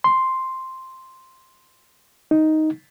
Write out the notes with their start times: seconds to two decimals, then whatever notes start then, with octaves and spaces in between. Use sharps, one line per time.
0.04 C6
2.31 D#4